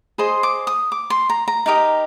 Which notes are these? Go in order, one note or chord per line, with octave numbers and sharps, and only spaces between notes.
G#4 C5 D#5 C6
D6
D#6
D6
C6
A#5
A#5
D#4 G4 A#4 D#5